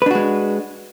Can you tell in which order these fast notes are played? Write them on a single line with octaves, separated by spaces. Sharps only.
B4 D4 F#4 G#3